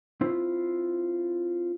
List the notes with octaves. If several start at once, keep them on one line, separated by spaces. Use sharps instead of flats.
C4 E4 F4 C5